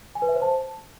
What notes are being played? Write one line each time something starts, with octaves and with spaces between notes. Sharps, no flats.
G#5
B4
E5
C5
A5